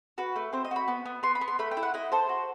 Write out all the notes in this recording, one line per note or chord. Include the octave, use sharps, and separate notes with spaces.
F#4 B4
A3
C4 C5
D#5
F#4 B5
B3
B3
B3 C6
B5
B3
C6
A3 B5
G5
E4
F#5
E4 D#5
A4 C5
F#4